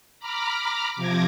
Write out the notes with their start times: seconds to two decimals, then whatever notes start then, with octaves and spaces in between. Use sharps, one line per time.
0.19 A#5 B5 D6 F6
0.96 C3 F3 D6 G#6 A#6